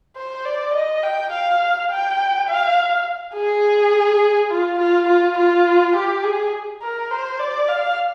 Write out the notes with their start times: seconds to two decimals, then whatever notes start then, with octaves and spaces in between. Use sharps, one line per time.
0.16 C5
0.45 D5
0.74 D#5
1.03 G5
1.32 F5
1.90 G5
2.49 F5
3.35 G#4
4.51 F4
4.79 F4
5.08 F4
5.38 F4
5.96 G4
6.24 G#4
6.82 A#4
7.11 C5
7.39 D5
7.69 F5